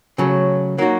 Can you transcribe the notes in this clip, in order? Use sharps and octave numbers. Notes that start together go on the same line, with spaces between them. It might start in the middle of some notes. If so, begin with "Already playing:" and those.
C#3 F#3 A3
F#3 A#3 D#4 F#4